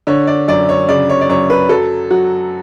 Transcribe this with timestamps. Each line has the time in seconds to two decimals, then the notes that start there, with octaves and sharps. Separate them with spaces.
0.07 D3 C#5
0.27 D5
0.48 F#2 D5
0.69 C#5
0.88 C#3 D5
1.09 C#5
1.21 D5
1.29 F#2 C#5
1.50 B4
1.69 F#3 A4
2.10 F#3 F#4